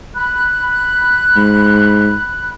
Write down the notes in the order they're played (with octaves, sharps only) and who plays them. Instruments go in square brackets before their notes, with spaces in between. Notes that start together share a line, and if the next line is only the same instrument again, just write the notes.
[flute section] B5 F#6
[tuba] G#2